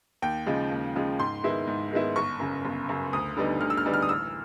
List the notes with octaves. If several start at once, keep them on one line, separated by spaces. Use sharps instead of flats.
D#2 G5
C#3 F3 G#3
D#2
C#3 F3 G#3
G#2 C6
D#3 G#3 B3 E4
G#2
D#3 G#3 B3 E4
G1 C#6
F#2 C#3
G1
F#2 C#3
D2 D#6
D3 G3 B3 D#4
D2 F6
E6
F6
D3 G3 B3 D#4
F6
D#6
A1 E6